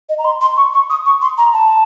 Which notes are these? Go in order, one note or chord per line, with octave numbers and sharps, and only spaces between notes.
D#5
A#5
C6
C6
C#6
C#6
D#6
C#6
C6
A#5
A5